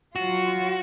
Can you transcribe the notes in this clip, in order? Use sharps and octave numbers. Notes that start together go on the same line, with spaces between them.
F#3 F4 F#4